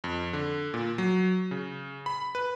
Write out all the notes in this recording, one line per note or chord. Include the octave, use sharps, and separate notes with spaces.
F2
D3
A#2
F#3
C#3
B5
B4